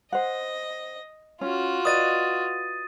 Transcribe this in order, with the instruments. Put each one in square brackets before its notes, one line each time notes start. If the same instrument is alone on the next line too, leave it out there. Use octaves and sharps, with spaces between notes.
[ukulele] C5 F#5 [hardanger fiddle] D#5
[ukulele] C#4 [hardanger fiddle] F4 F#4
[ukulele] B4 D5 D#5 [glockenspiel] D#6 A6 D#7